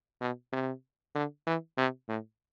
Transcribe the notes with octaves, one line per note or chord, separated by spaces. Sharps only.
B2
C3
D3
E3
C3
A2